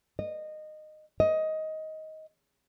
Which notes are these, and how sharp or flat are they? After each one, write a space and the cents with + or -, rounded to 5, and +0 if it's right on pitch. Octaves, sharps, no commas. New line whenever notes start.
D#5 -15
D#5 +15